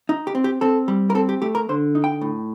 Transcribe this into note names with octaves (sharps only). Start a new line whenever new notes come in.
D#4
G4
C4
G4
C4 A4
G3
A#4
C4 A4
G4
A3 G4
A#4
D3 C5
D#4
G5
A2